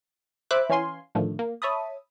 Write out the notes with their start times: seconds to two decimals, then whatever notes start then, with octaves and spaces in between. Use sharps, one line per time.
0.51 C5 E5 B5 D6 F#6
0.69 E3 C#4 F5 G#5 C6
1.15 A2 D3 D#3 F3 A3
1.39 A#3
1.62 C#5 E5 A5 B5 D#6